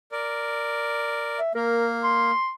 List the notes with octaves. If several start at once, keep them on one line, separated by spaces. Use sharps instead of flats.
A#4 D5
E5
A#3 A#4
C6